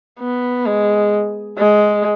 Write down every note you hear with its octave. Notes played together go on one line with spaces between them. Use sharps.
B3
G#3
G#3